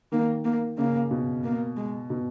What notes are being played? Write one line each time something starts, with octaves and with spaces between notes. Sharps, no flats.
D#3 A#3
A#3
C#3 A#3
B2
A#3
G#3
B2